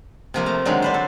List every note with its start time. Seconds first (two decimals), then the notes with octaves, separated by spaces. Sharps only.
0.34 C3 F3 A#3
0.46 A3 A#5
0.65 D3 D#3 F#3 G#3 F5
0.82 D4 B4 C5
0.94 A4